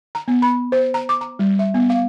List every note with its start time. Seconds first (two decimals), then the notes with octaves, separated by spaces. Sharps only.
0.15 A#5
0.28 B3
0.42 B5
0.72 C5
0.94 A#5
1.09 D6
1.21 A#5
1.39 G3
1.59 E5
1.74 B3
1.90 F5